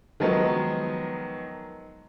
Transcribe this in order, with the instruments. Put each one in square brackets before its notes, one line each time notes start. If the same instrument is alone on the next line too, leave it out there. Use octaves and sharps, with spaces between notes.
[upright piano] D#3 F3 F#3 G#3 B3